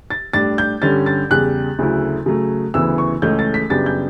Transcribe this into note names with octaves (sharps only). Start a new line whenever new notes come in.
A6
A2 G3 D4 A6
G6
G2 D3 G3 C#4 A6
A6
E2 C#3 G3 F#6
D2 C#3 F#3 A3 E4
C#3 F#3 A3
D2 C#3 E3 B3 E4 E6
C#6
C#2 C#3 E3 A3 C#4 G6
A6
B6
F#2 C#3 G3 B3 D4 A6
G6